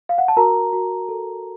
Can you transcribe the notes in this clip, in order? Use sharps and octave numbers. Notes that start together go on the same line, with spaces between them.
F5
F#5
A5
F#4 A#4 A#5
F#4
A4